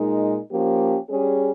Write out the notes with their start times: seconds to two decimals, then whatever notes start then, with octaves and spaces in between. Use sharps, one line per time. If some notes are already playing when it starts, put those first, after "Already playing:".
Already playing: A#2 G#3 D#4 A#4
0.50 F3 A#3 C#4 G4
1.08 G3 C#4 G#4